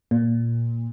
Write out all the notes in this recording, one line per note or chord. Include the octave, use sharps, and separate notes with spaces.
A#2